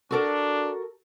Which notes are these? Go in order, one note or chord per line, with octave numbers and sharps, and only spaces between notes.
D4 F#4 A4 A#4